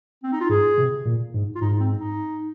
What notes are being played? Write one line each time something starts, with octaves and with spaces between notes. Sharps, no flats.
C4
D#4
F4
G#2 G#4
C3
A#2
G#2
F4
G#2 D#4
C4
D#4